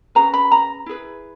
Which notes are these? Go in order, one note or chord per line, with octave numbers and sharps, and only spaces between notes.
C#4 G#4 B4 A#5
B5
A#5
E4 G#4 B4